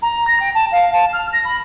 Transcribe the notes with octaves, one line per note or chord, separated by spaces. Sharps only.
A#5
A#6
G5
A5
F5
A5
F6
A#6
B5